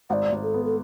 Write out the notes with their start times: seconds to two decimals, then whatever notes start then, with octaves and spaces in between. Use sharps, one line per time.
0.10 G#1 D5 F#5
0.32 G#1
0.43 A4
0.54 B3
0.65 A4